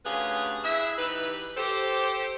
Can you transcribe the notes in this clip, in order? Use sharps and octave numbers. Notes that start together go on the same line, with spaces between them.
D2 C#4 G4 G#4 B4 F5
E4 G#4 B4 E5
E3 D#4 G4 B4
G4 A4 C5